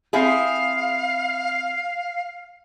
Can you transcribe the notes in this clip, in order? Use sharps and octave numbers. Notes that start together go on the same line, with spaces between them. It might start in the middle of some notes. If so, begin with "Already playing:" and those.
C4 E4 G#4 F5